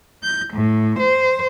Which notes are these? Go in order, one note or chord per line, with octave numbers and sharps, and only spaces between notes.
G6
A2
C5